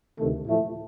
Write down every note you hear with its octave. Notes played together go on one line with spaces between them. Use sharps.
D2 C3 D#3 A3
A2 F3 A3